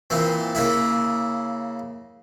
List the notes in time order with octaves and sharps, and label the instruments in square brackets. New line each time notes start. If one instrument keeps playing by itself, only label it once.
[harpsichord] A#2 E3 C4
C#3 A#3 E4